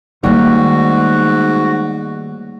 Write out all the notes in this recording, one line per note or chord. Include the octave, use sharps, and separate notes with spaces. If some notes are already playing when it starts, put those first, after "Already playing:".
G#2 D#3 G3 A3 A#3 C#4 F#4